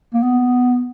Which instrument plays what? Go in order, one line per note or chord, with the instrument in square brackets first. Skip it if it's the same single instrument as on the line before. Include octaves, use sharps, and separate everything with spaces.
[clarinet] A#3
B3